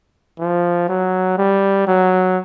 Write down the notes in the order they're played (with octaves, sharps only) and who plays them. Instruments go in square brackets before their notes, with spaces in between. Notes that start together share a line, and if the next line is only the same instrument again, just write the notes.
[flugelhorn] F3
F#3
G3
F#3